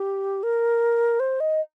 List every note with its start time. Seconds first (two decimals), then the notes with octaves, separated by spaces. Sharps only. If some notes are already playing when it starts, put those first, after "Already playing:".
Already playing: G4
0.43 A#4
1.20 C5
1.40 D#5